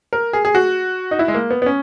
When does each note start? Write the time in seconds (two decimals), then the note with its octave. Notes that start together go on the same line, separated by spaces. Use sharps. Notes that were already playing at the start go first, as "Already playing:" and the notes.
0.13 A#4
0.33 G#4
0.45 G#4
0.55 F#4
1.11 D#4
1.19 E4
1.28 G#3
1.34 A#3
1.51 B3
1.62 B3
1.66 C#4